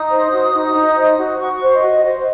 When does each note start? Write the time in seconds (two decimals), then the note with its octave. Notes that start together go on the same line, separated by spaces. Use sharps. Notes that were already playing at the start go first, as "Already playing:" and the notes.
Already playing: D#4 D#6
0.10 C5
0.31 F#4
0.53 D#4
0.74 D#4
0.97 C5
1.17 F#4
1.39 F#4 C#6
1.62 C5
1.73 D#5
1.83 F#4
2.04 C5 D#5